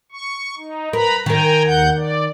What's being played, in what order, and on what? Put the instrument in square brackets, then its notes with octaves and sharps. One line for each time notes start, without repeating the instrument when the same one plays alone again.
[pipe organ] C#6
D#4
[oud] A#4 [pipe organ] B4 A#5 B5
[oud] D#3 A#4 [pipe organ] G5 G#5 A#5
[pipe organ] D#2 F#5 G6
D5